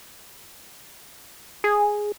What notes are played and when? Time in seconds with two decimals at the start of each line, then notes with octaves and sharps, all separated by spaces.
1.64 G#4